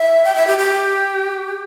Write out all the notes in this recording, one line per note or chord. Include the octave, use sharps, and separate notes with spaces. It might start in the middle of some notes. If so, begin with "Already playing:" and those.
Already playing: E5
G5
E5
G4
G4